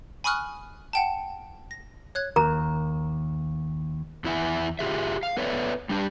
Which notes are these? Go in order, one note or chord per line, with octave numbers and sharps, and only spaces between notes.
G#5 B5 C#6 D#6 F6 F#6
F#5 G5 A5
A#6
C#5 F#6 G#6
D#2 A#4 A#5
E2 E4 E5 F#5 G#5
F4 G4 G#4 E5
F5
B3 A4 B4 C#5 D5 E5
G3 D4 G4